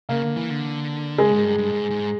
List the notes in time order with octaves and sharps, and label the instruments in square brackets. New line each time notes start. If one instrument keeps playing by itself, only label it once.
[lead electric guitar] C#3 [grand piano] A#3
[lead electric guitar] D3
E3
D3
[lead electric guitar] C#3 [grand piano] G#3
[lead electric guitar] G#2
G2
G2
G#2
G#2